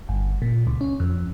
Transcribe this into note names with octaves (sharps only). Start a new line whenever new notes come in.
G1
A#2
C#2
C#4
F2